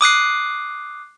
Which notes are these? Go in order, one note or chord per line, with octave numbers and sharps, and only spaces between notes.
D6 D#6 F#6 C7